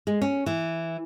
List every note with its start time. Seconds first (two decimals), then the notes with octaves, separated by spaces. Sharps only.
0.07 G#3
0.22 C#4
0.46 E3